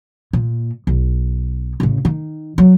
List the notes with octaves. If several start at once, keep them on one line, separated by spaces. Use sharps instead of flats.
A#2
B1
A1 C#3
D#3
F#3